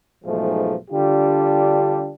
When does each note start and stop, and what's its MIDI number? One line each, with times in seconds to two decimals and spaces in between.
0.24 0.73 35
0.24 0.73 40
0.24 0.73 44
0.24 0.73 53
0.24 0.73 56
0.24 0.73 57
0.91 2.11 50
0.91 2.11 55
0.91 2.11 62
0.91 2.11 65
0.91 2.11 67